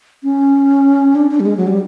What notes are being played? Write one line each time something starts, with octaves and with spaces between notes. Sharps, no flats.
C#4
D4
D4
G3
G#3
F#3
G3